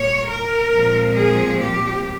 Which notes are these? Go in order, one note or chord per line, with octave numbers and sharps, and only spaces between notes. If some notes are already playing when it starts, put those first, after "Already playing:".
Already playing: A#2 G3 A#3 C#5
A#4
A#2 F3 G#3 C4
G#4
G4